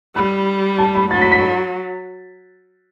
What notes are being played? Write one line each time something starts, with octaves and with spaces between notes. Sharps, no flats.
G3 B5
A5
B5
F#3 A6
B6
B6